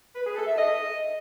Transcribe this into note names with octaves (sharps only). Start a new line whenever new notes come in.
B4
G#4
A4
E5
D#5